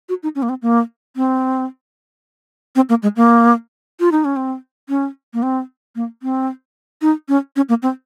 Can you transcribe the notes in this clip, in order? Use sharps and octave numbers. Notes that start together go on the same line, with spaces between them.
F#4
D#4
C#4
A#3
C4
A#3
C4
C4
A#3
G#3
A#3
F4
D#4
C#4
C4
C#4
A#3
C4
A#3
C4
D#4
C#4
C#4
A#3
C4